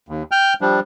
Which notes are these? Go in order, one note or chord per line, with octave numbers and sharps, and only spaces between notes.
D#2
G5 F6 G6
F3 G3 D4